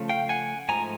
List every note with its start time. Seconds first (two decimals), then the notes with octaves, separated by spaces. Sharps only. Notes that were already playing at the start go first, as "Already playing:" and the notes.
Already playing: C#3 F3 A3
0.09 F5 G5
0.29 F#5 G#5
0.69 G#2 F3 A3 G#5 A#5